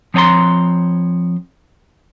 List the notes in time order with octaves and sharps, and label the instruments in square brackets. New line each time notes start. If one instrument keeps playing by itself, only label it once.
[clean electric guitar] F3 C4 C#5 G#5 A#5 C6